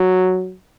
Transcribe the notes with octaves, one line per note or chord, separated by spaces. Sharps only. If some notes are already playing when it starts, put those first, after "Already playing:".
Already playing: F#3